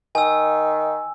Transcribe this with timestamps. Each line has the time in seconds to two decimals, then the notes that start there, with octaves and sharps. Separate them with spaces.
0.15 D#3 G#5 E6